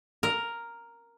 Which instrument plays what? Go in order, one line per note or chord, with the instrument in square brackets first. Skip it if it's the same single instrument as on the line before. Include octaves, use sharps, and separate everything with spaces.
[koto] A#4